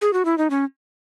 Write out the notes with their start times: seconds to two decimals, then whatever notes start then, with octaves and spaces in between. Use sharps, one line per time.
0.02 G#4
0.13 F#4
0.25 E4
0.38 D#4
0.50 C#4